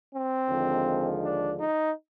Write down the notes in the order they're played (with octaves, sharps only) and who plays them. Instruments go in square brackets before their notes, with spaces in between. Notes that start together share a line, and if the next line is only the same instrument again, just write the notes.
[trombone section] C4
D#2 D3 F3 G#3
D4
D#4